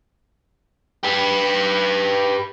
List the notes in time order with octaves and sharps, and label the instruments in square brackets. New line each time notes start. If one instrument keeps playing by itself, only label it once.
[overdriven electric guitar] G4 B4